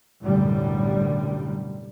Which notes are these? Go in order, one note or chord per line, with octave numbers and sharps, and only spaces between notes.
B1 F#2 A2 D3 G3